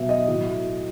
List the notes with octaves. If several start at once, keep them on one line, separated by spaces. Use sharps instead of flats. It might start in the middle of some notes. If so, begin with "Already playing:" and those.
Already playing: B2 F#3 E5
D#5
A2 F#3